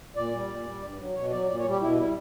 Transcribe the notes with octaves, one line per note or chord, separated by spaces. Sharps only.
A#2 D5
G3
A#2
G3
G2
F#3
B2 C#5
F#3 D5
A#2 D5
C#5
G3
G4
B2 E4
G3 E4